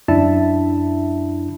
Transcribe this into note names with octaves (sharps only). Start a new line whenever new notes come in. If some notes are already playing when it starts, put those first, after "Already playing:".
F#2 D4 E4 E5 A5 B5